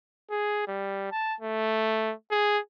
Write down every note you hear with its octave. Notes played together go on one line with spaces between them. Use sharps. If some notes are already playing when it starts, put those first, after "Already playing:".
G#4
G3
A5
A3
G#4